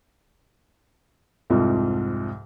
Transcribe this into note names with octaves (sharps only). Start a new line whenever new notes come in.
C2 F2 G#2 F3